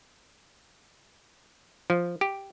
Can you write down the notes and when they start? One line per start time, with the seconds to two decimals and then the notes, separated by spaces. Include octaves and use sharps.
1.90 F3
2.21 G4